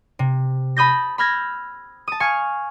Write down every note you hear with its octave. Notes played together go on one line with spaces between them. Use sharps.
C3
A5 B5 D#6 G6 A#6
B5 E6 F6 G6 G#6 A#6
A5 D#6
F5 G#5 C#6 F6 G#6 C#7